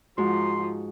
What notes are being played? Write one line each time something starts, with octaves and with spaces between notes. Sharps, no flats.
G#2 F3 F#4 C6